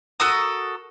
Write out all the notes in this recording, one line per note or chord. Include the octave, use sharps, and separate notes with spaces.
F#4 A4 A#4 D#6